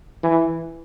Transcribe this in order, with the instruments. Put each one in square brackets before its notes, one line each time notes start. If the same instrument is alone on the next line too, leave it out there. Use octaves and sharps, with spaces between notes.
[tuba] E3